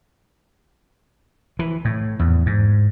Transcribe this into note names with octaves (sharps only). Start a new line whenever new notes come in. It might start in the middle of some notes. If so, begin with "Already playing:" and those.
E3
A2
E2
G#2